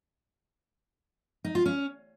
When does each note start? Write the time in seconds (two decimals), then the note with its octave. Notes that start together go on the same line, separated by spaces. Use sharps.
1.44 D#4
1.55 F4
1.66 C#4